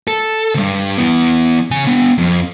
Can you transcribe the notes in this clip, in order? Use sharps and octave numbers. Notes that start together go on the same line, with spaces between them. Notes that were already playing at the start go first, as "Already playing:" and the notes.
A4
D2 G2
E3 B3
C#3 G#5
B3 D4
F2